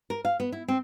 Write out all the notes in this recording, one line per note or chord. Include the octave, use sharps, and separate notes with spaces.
A#4
F5
B3
E4
C4